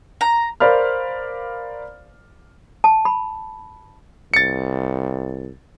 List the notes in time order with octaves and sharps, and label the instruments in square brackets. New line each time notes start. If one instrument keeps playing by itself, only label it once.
[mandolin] A#5
[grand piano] A#4 C5 D5 F5 B5 F6
[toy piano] A5
B5
[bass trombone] C2 [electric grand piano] A6 C#7